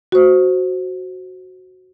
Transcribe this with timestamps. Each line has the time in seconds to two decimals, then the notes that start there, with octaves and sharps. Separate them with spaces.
0.12 F#4 C5